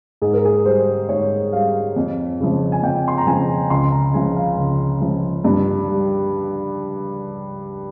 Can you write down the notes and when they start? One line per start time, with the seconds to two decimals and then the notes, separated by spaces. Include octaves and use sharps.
0.22 G#2 G#4
0.33 A#4
0.45 G#4
0.65 G3 C5
1.09 G#2 C#5
1.53 G3 F5
1.96 F2
2.40 C#3 F3
2.72 G#5
2.83 F2 G5
3.08 C6
3.18 A#5
3.27 C#3 F3 G#5
3.70 C#2 C6
3.92 A#5
4.14 C#3 F3 G#5
4.36 F5
4.58 C#2
5.01 C#3 F3
5.44 G2
5.88 G3